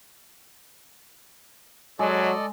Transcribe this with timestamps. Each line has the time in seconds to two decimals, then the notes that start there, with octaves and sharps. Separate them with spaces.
1.99 F#3 G#3 A4 D5 D#5